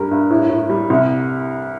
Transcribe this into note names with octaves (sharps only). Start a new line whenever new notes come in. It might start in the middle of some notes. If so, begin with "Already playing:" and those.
Already playing: G2 G3 A#4
G2
A2
A2
G3
C2